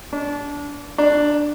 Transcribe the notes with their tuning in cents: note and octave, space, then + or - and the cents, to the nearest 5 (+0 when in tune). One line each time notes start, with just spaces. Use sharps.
D4 -25
D4 +5